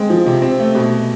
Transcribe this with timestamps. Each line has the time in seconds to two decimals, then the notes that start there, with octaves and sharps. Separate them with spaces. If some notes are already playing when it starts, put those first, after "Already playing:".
Already playing: G#3 C4
0.10 F3
0.26 C3
0.42 C4
0.59 A3
0.75 B2